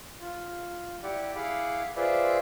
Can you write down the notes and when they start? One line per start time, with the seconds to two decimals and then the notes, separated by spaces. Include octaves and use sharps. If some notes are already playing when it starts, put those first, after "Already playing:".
0.21 F4
1.03 E4 G4 D5 F#5
1.36 E4 G#4 F5 F#5 B5 D6
1.96 F4 G#4 B4 C5 D5 E5